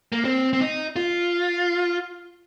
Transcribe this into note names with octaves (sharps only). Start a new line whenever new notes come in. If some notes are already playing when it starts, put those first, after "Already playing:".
A#3
C4
C4
D#4
F4